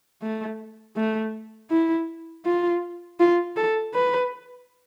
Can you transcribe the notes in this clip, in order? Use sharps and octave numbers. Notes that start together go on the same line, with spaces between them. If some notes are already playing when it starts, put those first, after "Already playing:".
A3
A3
E4
F4
F4
A4
B4